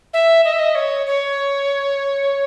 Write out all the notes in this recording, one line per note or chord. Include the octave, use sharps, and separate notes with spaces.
E5
D#5
E5
D#5
C#5
C#5